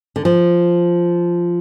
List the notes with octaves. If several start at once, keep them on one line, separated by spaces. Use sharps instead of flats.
D3
F3